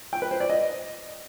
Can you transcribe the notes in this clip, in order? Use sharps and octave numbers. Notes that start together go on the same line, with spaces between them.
G5
B4
C5
D5
D#5